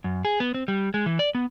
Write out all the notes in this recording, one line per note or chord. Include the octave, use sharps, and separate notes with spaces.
F#2
G#4
B3
C4
G3
G#3
E3
D5
B3